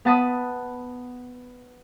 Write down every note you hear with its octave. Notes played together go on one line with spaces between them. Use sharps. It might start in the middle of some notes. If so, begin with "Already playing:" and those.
B3 F#5 A5 B5 D#6